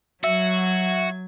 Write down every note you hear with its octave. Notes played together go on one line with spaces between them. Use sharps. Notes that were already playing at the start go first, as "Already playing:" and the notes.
F#3 F#4 E5 G#6